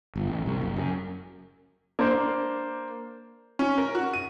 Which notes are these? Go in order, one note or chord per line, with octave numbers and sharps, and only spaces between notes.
G1
A1
C2
F#1
F#2
A#3 D4 C5
C#4
A#4
F#4
D#7